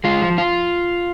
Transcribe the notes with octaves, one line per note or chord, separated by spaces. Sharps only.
G#3 F4
F3
F4